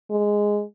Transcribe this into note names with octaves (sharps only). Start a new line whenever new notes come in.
G#3